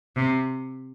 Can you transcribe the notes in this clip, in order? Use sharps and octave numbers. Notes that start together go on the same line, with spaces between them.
C3